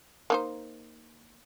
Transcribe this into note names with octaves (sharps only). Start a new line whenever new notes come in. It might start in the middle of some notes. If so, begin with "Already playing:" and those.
A#3 D#4 C5